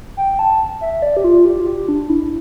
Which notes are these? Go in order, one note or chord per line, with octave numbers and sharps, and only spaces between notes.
G5
A5
E5
D5
G4
F4
G4
F4
G4
D4
E4